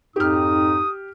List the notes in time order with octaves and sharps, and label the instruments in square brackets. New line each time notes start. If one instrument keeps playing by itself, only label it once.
[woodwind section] F2 G#2 D#4 [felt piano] G4 F6 [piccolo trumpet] D#6